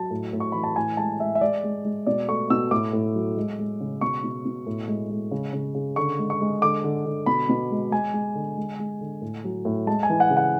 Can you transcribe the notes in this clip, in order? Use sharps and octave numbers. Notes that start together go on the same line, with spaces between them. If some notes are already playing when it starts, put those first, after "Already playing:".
Already playing: F#3 A5
A2
A2
C#6
E3 B5
A5
A2 G#5
G#3 A5
G#3 E5
E5
G#3 D5
G#3
G#3
B2 D5
A3 C#6
B2 E6
A2 D6
A2
F#3
G#3
G#3
C#3
B2 C#6
B2
B2
A2
G#3
G#3
C#3
C#3
C#3
D3 C#6
G#3
C#6
G#3
D3 D6
D3
D3
B2 B5
B2
G#3
G#3 G#5
G#3
D3
G#3
G#3
D3
A2
F#3
A2
G#3 A5
G#5
E3
F#5
C#3
F#5